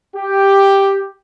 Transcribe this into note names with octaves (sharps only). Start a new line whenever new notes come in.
G4